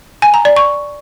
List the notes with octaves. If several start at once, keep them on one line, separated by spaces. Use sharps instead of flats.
G#5
A#5
D5
C#6